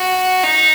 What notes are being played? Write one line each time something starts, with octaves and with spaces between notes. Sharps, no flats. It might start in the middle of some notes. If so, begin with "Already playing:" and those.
Already playing: F#4
D#4